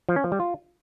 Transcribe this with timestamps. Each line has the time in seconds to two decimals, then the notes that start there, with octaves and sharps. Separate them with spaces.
0.09 F3
0.16 C#4
0.24 F3
0.32 G3
0.40 F4